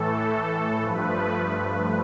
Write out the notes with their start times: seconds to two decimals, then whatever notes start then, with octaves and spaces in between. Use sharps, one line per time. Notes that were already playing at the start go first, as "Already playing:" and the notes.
Already playing: A2 E3 A3 A4
0.31 A4
0.83 G2 F3 A3 B4